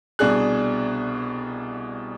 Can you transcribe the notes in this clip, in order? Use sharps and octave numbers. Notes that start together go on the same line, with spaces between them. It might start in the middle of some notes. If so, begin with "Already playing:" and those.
C2 B2 D4 G#4 F#6